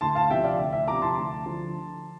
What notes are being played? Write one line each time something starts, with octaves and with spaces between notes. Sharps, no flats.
D2 A5 C6
F5 A5
C3 F3 E5 G5
D5 F5
D2 E5
E5
C3 F3 A#5 D6
A5 C6
D2
D3 F3